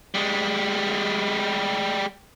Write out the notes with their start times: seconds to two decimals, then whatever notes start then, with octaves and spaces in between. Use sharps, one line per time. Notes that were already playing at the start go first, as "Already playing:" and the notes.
0.15 G3 G#3